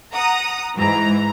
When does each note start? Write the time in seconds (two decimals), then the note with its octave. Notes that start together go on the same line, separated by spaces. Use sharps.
0.13 F#5 A#5 D#6
0.77 G#2 E3 A#5